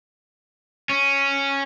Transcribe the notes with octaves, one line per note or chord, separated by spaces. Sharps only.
C#4